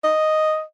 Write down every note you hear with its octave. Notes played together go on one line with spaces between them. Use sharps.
D#5